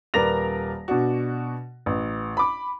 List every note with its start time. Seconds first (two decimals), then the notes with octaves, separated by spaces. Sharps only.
0.14 D#1 A#4 B4 D5 A#6 F7
0.88 B2 D4 F#4
1.86 A1
2.37 B5 D6